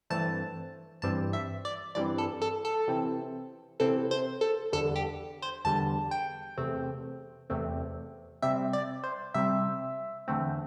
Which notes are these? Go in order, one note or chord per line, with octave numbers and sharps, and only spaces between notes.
G2 E3 A3 C4 A5
G2 E3 G3 C4 A5
E5
D5
G2 E3 G3 C4 D5
A4
A4
A4
C3 E3 C4
C3 E3 C4 A4
C5
A4
E2 D3 G3 A4
G4
C5
E2 D3 G3 A5
G5
E2 C3 A3 C4
E2 C3 A3 C4
C3 G3 C4 E5
D5
C5
C3 G3 C4 E5
E2 D3 A3 C4